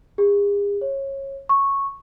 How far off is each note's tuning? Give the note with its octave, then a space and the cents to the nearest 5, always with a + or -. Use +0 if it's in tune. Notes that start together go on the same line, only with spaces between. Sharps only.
G#4 -45
C#5 -20
C#6 -5